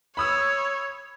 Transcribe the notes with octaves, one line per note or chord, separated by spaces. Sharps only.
C#5 B5 D#6 E6